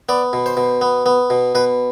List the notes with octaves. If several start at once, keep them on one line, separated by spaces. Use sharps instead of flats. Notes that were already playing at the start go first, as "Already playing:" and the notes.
B3 D5
B2
C5
B2
B3
B3
B2
B2 B4